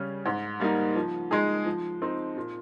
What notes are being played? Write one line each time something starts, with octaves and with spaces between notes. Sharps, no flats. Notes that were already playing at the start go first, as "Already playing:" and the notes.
Already playing: C#3 G3 C#4
G#2
G3 A#3 D#4
F3
G#3 D#4 G#4
F3
C4 D#4
A#2